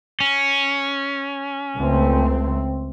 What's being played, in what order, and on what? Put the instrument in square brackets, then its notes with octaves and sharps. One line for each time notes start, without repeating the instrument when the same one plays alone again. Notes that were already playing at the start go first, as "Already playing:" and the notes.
[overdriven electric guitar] C#4
[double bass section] C#2 A3 C4